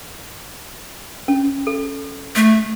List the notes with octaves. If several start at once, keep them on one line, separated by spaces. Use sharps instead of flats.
C#4
A4
A3